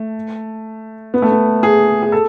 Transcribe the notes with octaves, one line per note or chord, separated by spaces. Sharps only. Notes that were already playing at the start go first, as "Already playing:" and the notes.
Already playing: A3
B3
A3
B3
G#4
G#4
A4